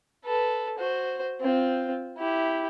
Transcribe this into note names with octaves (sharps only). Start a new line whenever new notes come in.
A4 B4
F#4 C5
C4 F4
E4 G4